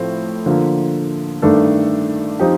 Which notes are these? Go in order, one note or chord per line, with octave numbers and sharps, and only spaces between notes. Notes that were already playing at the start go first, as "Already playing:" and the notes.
Already playing: A2 F3 C4
D3 F3 A#3 F4
G2 D#3 A3 D4 A4
F3 C4 D#4 G4